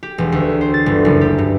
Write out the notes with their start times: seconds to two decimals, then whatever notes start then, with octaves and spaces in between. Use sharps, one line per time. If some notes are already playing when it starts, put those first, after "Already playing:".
0.03 G4
0.18 E1
0.32 D2
0.61 C5
0.74 A6
0.86 G1
1.05 F#1
1.21 G4
1.38 G2